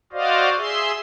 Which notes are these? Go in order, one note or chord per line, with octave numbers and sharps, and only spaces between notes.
F#4 C5 D5 D#5 F5
G#4 E5 C6